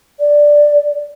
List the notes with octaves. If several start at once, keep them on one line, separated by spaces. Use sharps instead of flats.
D5